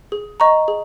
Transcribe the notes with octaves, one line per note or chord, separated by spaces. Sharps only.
G#4
D#5 A#5 C#6
G#4